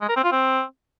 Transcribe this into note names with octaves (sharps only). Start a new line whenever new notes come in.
G#3
A#4
C4
F4
C4